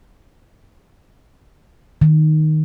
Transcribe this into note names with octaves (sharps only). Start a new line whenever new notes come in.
D#3